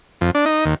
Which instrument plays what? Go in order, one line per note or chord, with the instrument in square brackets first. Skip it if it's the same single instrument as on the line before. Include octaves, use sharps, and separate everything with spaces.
[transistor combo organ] F2
D4
D#4
D#2